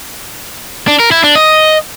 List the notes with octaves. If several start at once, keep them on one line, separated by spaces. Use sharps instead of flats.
D4
A#4
E4
D4
D#5